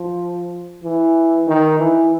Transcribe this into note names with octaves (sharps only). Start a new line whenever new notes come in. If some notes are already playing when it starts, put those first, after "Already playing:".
Already playing: F3
E3
D#3
E3